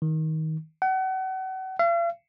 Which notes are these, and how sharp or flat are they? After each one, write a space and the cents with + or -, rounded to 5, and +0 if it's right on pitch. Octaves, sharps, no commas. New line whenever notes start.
D#3 +20
F#5 +35
F5 -45